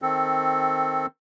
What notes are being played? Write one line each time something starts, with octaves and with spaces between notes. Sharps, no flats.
D#3 C4 A4